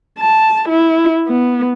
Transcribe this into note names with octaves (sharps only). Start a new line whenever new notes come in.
A5
E4
B3